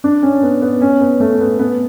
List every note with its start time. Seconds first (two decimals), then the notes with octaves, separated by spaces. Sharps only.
0.04 D4
0.23 C#4
0.43 B3
0.62 B3
0.81 C#4
1.01 B3
1.20 A3
1.40 B3
1.59 B3